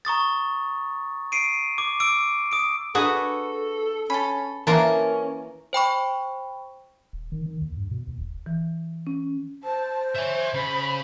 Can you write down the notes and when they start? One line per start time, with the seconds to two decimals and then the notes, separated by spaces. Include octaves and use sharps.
0.05 A#5 C#6 D#6 A6
1.32 C7 D7 D#7
1.78 D6
2.00 D6 E6 D7
2.51 D#6 D7
2.95 D4 F#4 G#4 A4 B4 D#6
4.10 C#4 A4 B5
4.67 E3 A#3 C#4 A#4 A5 C6
5.73 C5 G5 B5 C#6
7.13 D#1
7.32 D#3
7.46 D#3
7.61 D#2
7.77 G2
7.91 B2
8.08 D#2
8.20 E1
8.46 E3
9.07 C#4
9.64 C5 A5
10.15 C#5 E5 G#5
10.54 C#3 B5